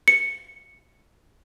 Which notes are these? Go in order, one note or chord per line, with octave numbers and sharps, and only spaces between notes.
C#7